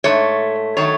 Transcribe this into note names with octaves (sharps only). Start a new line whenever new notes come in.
G#2 E3 A3 C#5
D#3 F#3 A3 C#5